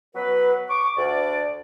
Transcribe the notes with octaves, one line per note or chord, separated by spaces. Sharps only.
F#3 B3 B4
C#6 D6
D2 D5